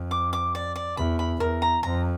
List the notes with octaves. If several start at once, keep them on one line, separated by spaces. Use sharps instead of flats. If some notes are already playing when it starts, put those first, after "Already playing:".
Already playing: F2
D6
D6
D5
D5
E2 B5
B5
E2 A#4
A#5
F2 A#5